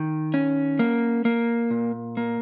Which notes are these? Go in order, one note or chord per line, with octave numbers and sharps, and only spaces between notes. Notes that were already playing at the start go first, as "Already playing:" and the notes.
Already playing: D#3
C#4
A#3
A#3
A#2
A#3